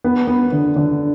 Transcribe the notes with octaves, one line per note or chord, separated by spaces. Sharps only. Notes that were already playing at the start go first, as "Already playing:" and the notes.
B3
B3
D3
D3